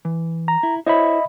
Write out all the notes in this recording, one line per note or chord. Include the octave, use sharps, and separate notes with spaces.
E3
A#5
E4
E4 C5 C#5 D#5 E5 B5